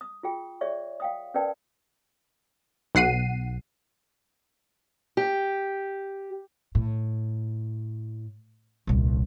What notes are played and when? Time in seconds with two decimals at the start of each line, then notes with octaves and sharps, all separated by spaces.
0.01 D#6
0.23 F4 G#4 G5
0.61 G#4 C#5 D5 E5 C#6
1.00 F5 G5 D#6
1.34 C#4 A#4 B4 D5 G5 A5
2.95 B1 F#5 C7 D#7
5.17 G4
6.75 A2
8.87 D#1 C2